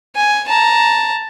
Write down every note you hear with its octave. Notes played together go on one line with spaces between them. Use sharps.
G#5
A5 A#5